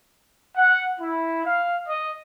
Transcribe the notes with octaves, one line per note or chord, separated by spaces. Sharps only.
F#5
E4
F5
D#5